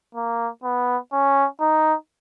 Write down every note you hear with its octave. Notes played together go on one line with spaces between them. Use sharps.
A#3
B3
C#4
D#4